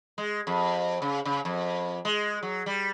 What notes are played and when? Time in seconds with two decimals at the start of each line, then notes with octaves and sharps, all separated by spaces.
0.18 G#3
0.47 F2
1.02 C#3
1.25 C#3
1.45 F2
2.05 G#3
2.43 F#3
2.66 G3